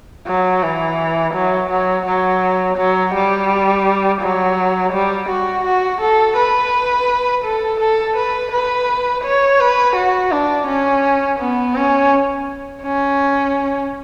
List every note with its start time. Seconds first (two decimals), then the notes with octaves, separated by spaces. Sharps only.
0.27 F#3
0.63 E3
1.35 F#3
1.71 F#3
2.07 F#3
2.78 F#3
3.14 G3
4.22 F#3
4.93 G3
5.30 F#4
5.65 F#4
6.01 A4
6.37 B4
7.45 A4
7.80 A4
8.17 B4
8.52 B4
9.24 C#5
9.60 B4
9.96 F#4
10.32 D4
10.67 C#4
11.40 B3
11.76 C#4
12.83 C#4